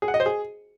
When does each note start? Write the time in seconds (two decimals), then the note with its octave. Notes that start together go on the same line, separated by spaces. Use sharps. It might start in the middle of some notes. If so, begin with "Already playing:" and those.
0.02 G#4
0.08 F#5
0.14 D#5
0.20 C5
0.26 G#4